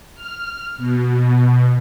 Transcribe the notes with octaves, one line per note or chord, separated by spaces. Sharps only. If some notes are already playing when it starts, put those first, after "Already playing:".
F6
B2